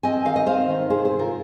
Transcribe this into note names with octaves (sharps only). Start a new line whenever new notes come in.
C4 D#5 G#5
D#3 F5
D#5
C4 C5 F5
D#3
C3 G#4 C5
G#4 C5
C3
F4 A#4